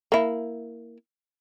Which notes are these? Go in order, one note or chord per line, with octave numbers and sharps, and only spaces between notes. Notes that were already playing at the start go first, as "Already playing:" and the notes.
A#3 E4